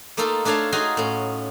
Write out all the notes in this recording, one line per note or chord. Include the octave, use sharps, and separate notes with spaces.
A3 A#3 D#4 F4 A4
A3 D4 A4 C#5 F5 A5
D#4 F4 F#4 G#4 D#5
A2 C#4